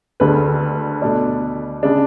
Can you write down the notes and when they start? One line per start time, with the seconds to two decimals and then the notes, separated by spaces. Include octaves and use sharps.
0.20 D2 D3 G#3 B4
1.02 B2 A3 D4
1.83 C#3 G#3 D4